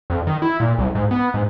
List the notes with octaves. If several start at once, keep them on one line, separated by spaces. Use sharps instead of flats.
F2
D#3
E4
A#2
C2
G#2
B3
G#2